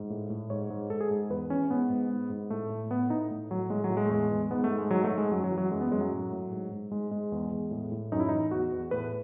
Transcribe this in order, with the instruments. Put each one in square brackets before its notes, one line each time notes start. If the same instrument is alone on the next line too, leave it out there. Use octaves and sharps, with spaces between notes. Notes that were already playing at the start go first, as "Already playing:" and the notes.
Already playing: [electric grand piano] G#2
A2
A2
G#2 C#5
G#2
G#2 A4
G#4
G#2
E2 B4
E3 C#4
G#2 B3
G#2
G#2
G#2
A2 A3
A2
A2 B3
A2 D#4
A2
A2 F#3
A2 G#3
F#3
A2
G#3
A3
E2 G#3
E2
G#2 B3
A3
G#2
G#3
G#2 F#3
A3
G#2
G#3
F#2 F#3
F#3
E3
F#3
F#2 G#3
B3
F#2 G#3
F#3
A2
A2
G#2
G#2
G#2 G#3
G#2 G#3
E2
E2
A2
A2
F#2 D#4
E4
E3 D#4
E2 F#4
E2
A2 B4